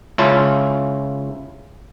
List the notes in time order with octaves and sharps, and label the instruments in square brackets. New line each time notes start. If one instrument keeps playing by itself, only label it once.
[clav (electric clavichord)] C#2 C#3 C#4 E4 F4 A5